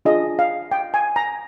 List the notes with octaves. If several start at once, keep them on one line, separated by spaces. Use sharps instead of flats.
D4 F4 G#4 D#5
F5
G5
G#5
A#5